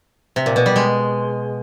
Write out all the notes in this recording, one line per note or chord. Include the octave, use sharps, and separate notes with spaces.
C3
A#2
B2
G3
G#3